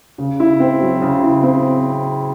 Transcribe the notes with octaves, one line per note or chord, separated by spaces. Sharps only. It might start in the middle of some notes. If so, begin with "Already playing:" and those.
C#3
E4
C4
F#3
C#3
E4
C4